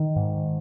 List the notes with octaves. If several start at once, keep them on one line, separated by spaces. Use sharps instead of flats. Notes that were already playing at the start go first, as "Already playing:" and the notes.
Already playing: D#3
G#2